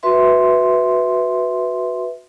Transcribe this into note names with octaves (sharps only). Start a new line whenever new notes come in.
F#4 B4 E5 C6